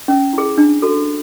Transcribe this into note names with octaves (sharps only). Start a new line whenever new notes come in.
C#4
E4 G#4
D4
F#4 A4